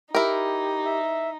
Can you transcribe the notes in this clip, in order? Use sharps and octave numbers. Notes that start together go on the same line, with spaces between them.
D#4 E4 G4 A#4
E5